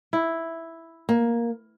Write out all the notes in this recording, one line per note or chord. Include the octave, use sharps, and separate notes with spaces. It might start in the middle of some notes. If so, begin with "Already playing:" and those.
E4
A#3